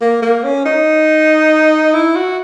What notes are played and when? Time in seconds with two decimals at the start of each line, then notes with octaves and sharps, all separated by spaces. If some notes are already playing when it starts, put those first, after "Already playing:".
0.01 A#3
0.22 A#3
0.44 C#4
0.66 D#4
1.94 E4
2.16 F#4